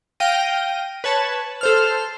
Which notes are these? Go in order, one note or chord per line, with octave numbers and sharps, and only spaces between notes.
F5 G5 A#6 D#7
B4 C#5 A5
A4 C5 F6